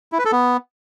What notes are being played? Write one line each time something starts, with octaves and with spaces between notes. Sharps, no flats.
E4
B4
A4
B3